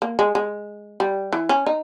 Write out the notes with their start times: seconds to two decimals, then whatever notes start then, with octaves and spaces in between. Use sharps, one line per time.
0.02 A#3
0.19 G#3
0.35 G#3
1.00 G3
1.33 E3
1.49 C#4
1.66 D#4